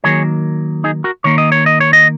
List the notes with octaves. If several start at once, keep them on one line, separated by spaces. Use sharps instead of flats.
D#3 F#3 A#3 G#4 C#5
D#4 G#4
F#4 A#4
D#3 A#3 C#5
D#5
C#5
D#5
C#5
D#5